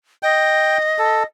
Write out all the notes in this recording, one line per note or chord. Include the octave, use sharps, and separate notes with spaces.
D#5 G5
A4